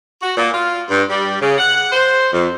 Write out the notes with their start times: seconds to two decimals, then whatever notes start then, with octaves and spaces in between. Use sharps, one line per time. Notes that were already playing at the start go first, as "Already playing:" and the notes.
0.22 F#4
0.36 A#2
0.54 F4
0.88 G2
1.09 G3
1.40 C#3
1.58 F#5
1.92 C5
2.33 F2